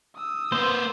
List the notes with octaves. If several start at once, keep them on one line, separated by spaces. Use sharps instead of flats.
D#6 E6
A#3 B4 C5